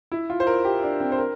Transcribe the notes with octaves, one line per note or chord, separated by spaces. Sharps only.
E4
F4
C5
A#4
G4
D4
C4
C5
A#4